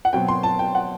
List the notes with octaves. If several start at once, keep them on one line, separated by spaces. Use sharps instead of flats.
F#5
B2 F#3 C4 G5
C6
A5
G5
F#5